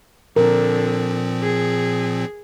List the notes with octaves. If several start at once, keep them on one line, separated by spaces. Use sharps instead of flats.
A#2 D3 F3 C4 A#4
G#4